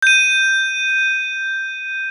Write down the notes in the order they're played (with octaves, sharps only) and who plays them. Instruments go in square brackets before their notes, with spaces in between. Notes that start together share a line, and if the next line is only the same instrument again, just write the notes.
[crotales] G6 D#7